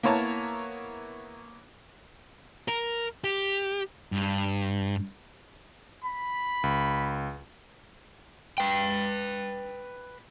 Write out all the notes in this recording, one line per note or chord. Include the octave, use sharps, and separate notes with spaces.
A#3 B3 E4 C#5 A5 A#5
A#4
G4
G2
B5
C#2
B4 G5